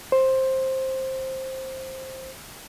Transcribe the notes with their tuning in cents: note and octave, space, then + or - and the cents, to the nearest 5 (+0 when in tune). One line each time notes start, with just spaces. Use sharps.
C5 +10